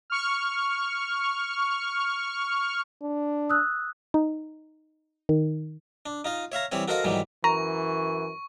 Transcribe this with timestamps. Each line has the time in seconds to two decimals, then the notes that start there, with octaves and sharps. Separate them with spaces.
0.10 C#6 F6
3.03 D4
3.50 D#6 E6 F#6
4.14 D#4
5.29 D#3
6.06 D4
6.25 D#4 F4 D#5
6.52 C#5 E5 F5 A#5
6.72 E3 G3 C4 C#5
6.88 F#4 A4 A#4 C5 D#5 F5
7.04 G#2 D#3 E3 F#3 G3
7.44 F#2 E3 A#5 C#6